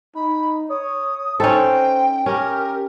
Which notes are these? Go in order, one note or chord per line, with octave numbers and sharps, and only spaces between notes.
D#4 B5
C#5 D#6
C#4 D#4 A4 C5 G5
C#4 G4 A#4